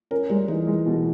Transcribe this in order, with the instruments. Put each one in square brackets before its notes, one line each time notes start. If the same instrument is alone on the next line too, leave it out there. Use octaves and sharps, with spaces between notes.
[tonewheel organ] C#4 [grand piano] A#4
[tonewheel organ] G3 [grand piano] G#3
[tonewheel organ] E3 [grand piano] D#4
[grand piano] G#3
B2